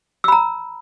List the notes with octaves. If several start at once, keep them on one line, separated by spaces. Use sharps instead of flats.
A#5 B5 E6